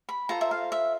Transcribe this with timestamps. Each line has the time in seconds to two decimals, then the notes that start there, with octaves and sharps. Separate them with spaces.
0.09 B5
0.29 F4 A4 C5 A#5
0.41 E5
0.51 F5
0.72 E5